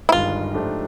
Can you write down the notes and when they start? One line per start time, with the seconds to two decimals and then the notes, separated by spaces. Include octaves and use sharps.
0.09 E4
0.12 G1 G2 D#3 G#3 F4
0.54 G#2 F3 A3 D4 G4